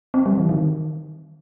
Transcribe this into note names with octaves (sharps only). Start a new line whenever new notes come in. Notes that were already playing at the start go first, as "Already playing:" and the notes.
C4
G3
E3
D#3